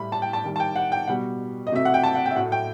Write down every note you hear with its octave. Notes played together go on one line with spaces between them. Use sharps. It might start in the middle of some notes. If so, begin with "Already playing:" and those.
Already playing: A2 G3 B5
A5
G5
A5
D#3 G3
A5
G5
F#5
G5
B2 G3 F#5
D#5
C3 F#3 A3 E5
F#5
G5
A5
F#5
G5
E5
A2 F#3 A3 F#5
G5